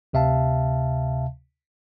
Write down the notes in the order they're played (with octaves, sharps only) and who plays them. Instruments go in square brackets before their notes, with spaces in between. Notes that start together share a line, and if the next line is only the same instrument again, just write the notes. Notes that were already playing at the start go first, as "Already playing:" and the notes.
[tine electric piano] D2 C3 E5 F5 A5